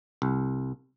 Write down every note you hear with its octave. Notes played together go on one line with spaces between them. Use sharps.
C2